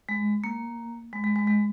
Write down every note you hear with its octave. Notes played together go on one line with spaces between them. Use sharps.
G#3
A#3
G#3
G#3
G#3
G#3